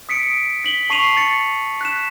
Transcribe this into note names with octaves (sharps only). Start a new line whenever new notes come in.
D#6 B6 C#7 D7
B6 F#7 G7
A5 C#6 C7 D#7 F7 F#7
A6 C#7
F#6 B6 E7